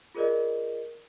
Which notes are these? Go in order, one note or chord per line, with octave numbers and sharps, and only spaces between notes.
F4 G#4 A#4 C5 D5 D#5